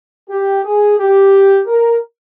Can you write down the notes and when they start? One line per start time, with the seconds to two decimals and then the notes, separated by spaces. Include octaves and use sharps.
0.29 G4
0.63 G#4
0.98 G4
1.67 A#4